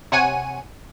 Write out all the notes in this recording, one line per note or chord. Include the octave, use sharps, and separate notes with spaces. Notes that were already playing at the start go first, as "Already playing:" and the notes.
C3 C#5 F#5 G#5 D#7